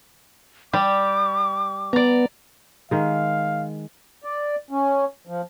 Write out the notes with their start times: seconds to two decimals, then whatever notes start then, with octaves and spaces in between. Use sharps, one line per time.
0.73 G3 G4 D6
1.93 B3 D5 A#5
2.91 D#3 G#3 F5
4.24 D5
4.71 C#4
5.27 F3